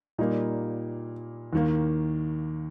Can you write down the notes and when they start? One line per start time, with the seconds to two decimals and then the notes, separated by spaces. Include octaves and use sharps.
0.18 A#2 G3 A#3 D#4
1.53 D#2 D#3 A#3